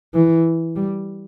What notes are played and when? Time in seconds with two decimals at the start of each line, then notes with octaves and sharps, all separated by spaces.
0.14 E3
0.76 G3